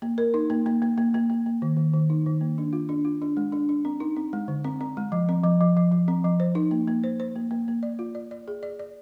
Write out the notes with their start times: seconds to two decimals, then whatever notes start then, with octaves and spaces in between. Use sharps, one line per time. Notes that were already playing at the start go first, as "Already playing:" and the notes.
0.02 A#3
0.18 A#4
0.34 D#4
0.50 A#3
0.66 A#3
0.82 A#3
0.98 A#3
1.14 A#3
1.30 A#3
1.46 A#3
1.62 D#3
1.77 D#3
1.93 D#3
2.10 D#4
2.26 D#3
2.41 A#3
2.58 D4
2.73 F4
2.89 D4
3.05 F4
3.22 D4
3.37 G#3
3.52 D4
3.69 D4
3.85 C4
4.00 D#4
4.16 C4
4.33 G#3
4.48 D3
4.64 C4
4.81 C4
4.97 G#3
5.12 F3
5.29 C4
5.44 F3
5.61 F3
5.77 F3
5.92 F3
6.08 C4
6.24 F3
6.40 C5
6.55 D#4
6.71 A#3
6.88 A#3
7.04 C5
7.20 C5
7.36 A#3
7.51 A#3
7.68 A#3
7.83 D5
7.99 F4
8.15 D5
8.31 D5
8.48 G#4
8.63 D5
8.79 D5